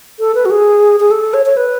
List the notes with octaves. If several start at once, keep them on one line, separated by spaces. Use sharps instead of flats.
A4
B4
F#4
G#4
G#4
A4
C#5
C#5
B4